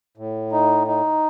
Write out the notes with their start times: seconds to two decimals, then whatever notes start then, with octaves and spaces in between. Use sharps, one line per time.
0.17 A2
0.52 D#4
0.87 D#4